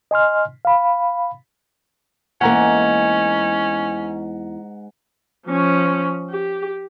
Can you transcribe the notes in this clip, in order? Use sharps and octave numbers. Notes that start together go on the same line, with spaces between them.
D#5 G#5 C6 F6
F5 B5
E2 G#2 A#3 C#4 F#5 G#5 A#5
F3 C#4
G4